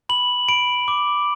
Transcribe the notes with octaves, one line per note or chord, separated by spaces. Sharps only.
B5 F#7
B5 D7
D6